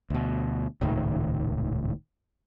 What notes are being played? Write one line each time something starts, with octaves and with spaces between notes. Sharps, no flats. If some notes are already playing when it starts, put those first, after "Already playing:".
D2 B2
D#1 C#2 A2 D#3